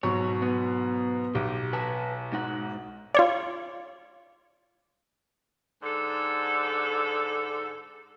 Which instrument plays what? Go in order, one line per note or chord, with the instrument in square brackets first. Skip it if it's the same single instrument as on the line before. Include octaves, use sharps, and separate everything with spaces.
[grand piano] G#2 B2 F#3 [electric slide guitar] C#5
[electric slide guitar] B3
[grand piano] B1 [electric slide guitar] G4
[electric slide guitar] B4 G#5 A5
G#2 D#4 F#5
[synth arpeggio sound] F4 C#5 D5
[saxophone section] G#2 D3 A4